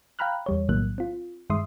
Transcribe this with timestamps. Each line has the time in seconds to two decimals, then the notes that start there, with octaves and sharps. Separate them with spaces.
0.19 F5 G5 A#5 B5 F6 F#6
0.46 E2 G3 C#5
0.69 B1 A2 D#3 F#3 A#3 F#6
0.98 C4 F4
1.50 G2 D#3 G#3 E5 C6 D#6